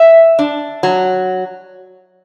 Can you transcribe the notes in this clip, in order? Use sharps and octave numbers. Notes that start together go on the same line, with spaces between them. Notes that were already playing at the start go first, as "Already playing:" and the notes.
Already playing: E5
D4
F#3